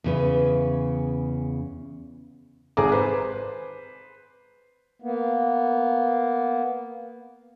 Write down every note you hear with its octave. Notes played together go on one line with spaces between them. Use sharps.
E2 C#3 B4
G#1 G#4 A4 A#5 D6
B4 C5
A#3 B3